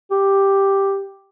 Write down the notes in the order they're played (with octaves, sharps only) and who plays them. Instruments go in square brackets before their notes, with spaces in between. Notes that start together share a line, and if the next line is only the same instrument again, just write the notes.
[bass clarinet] G4